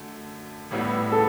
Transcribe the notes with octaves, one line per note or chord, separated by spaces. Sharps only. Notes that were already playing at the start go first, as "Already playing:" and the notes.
Already playing: F#2 D3 A3
A1 A2 G3 B3 E4
A4